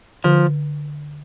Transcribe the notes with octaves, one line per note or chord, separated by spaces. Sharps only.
D3 F3